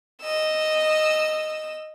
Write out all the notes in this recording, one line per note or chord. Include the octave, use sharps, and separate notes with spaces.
D#5 E6